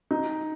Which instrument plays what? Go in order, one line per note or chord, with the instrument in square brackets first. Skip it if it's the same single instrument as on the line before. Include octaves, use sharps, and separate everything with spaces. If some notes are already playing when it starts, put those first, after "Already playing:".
[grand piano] D#4